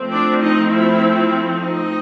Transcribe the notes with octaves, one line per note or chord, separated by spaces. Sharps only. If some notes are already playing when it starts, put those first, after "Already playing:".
Already playing: F3 A3 C4
D4 D5
D#4 D#5
E4 E5
D#4 D#5